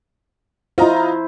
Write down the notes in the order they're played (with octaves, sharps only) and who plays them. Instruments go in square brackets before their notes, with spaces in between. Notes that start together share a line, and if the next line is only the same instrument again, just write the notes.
[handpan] E4 C5 [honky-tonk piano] F4 D#5 A#5